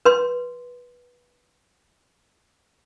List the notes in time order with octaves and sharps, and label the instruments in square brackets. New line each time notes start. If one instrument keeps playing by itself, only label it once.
[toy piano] B4 C6